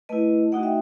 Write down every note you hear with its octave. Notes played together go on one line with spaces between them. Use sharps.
A3 E4 B4 D#5
A3 D#4 F#4 D#5 F#5
E5 G5